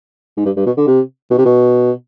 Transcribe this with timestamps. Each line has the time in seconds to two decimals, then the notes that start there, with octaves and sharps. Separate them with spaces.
0.37 G#2
0.46 G2
0.57 G2
0.66 B2
0.77 D3
0.88 C3
1.31 B2
1.39 C3
1.46 B2